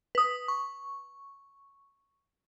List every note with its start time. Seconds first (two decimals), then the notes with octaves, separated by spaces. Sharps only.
0.15 B4 D#6
0.48 C#6